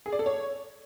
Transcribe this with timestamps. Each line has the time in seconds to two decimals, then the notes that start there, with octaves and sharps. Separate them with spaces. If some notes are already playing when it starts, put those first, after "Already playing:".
0.06 G#4
0.13 D5
0.19 A4
0.26 C#5